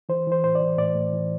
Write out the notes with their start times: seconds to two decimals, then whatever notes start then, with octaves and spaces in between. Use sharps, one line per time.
0.09 E3 C5
0.27 E3 C5
0.44 A2 C5
0.55 D5
0.61 E3
0.78 A2 D5
0.95 A2
1.13 E3